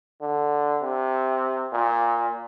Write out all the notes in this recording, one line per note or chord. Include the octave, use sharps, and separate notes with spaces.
D3
C3
A#2